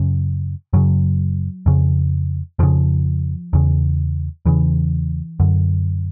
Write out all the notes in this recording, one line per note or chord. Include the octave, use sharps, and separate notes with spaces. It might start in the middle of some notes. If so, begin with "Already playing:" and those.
Already playing: F#2 C#3
F#2 C#3 F#3
F2 C#3
F2 C#3 F3
E2 C#3
E2 C#3 E3
F#2 D3